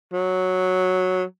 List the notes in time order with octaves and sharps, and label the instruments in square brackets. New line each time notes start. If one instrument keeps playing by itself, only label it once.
[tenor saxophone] F#3